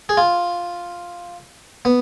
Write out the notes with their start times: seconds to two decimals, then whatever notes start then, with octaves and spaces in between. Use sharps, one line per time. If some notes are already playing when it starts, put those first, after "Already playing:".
0.09 G#4
0.17 F4
1.85 B3